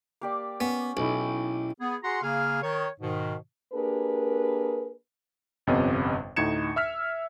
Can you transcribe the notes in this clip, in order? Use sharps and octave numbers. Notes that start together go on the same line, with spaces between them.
A#3 G4 D5
B3 C#4
B1 C#4 D#4 E4
B3 G#4
F#4 G#4 F#5 A#5 C6
C#3 A#3 G#4 F5 G#5 F6
D#3 C#5
G#2 B2 D#3
A#3 D4 G4 G#4 A#4 B4
G1 F2 C3 B3 C#4 D#5
D2 A2 D#4 G#6 C#7 E7
E5 E6 F6 B6